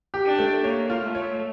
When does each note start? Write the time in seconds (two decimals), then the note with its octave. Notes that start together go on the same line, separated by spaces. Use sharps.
0.14 G4
0.26 D4
0.39 A3
0.64 A#3 C#5
0.90 F4
1.03 A3
1.15 C#5